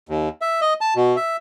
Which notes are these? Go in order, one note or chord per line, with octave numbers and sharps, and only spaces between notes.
D#2
E5
D#5
A5
B2
E5